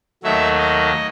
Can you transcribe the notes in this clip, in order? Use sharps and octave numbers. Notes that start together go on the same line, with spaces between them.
D#2 D#3 F#3 A3 E5
D#5